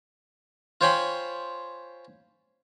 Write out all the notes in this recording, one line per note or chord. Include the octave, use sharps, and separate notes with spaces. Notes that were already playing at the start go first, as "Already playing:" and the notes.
F4 C5 C#5 G5 G#5 B5